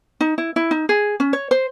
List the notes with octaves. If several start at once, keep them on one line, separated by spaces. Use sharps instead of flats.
D#4
E4
E4
D#4
G#4
C#4
C#5
C5